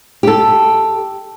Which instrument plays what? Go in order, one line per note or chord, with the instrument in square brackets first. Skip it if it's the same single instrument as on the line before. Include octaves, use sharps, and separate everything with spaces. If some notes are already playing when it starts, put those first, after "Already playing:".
[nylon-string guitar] G4 A4